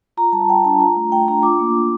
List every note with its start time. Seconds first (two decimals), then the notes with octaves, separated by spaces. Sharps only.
0.17 F4 A#5
0.32 G3 A5
0.48 G3 G5
0.65 D4 A5
0.80 F4 A#5
0.96 A3
1.12 A3 G5
1.28 D4 A#5
1.43 F4 D6
1.59 A#3
1.75 A#3